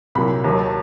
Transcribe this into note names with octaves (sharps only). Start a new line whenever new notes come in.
C2 A#2 F#3 B5
D#2 D#3 F#3 A#5
A5